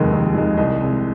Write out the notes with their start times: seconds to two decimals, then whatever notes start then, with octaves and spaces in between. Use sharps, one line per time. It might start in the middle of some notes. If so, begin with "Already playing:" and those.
Already playing: F1 D#2 D#3 G#3
0.12 F1
0.35 D#2 D#3 G#3
0.57 C2 D#5
0.80 C3 G#3